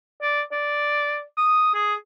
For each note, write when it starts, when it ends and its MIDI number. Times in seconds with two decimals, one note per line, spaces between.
0.22 0.42 74
0.52 1.22 74
1.38 1.73 87
1.74 1.94 68